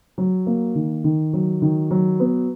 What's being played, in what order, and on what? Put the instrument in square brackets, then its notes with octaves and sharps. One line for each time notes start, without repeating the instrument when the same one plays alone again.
[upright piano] F#3
A#3
D#3
D#3
F#3
D#3
F#3
B3